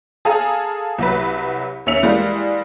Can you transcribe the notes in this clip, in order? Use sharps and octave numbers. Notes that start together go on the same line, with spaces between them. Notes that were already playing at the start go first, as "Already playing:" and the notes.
G#4 A4 F5 G#5 A#5
C2 F#3 B4
D#2 C#4 E5 C#7 F7
E3 G3 G#3 A#3